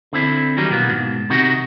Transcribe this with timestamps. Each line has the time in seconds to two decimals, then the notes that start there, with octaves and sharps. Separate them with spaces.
0.13 D3 C4 E4
0.57 D#3 E3 F#3 G3 D#4
0.71 B2 A#3 B3
0.90 G#2 B2
1.30 C3 D#3 D#4 F#4